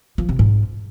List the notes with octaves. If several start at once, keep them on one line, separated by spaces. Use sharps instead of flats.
F3
C3
G#2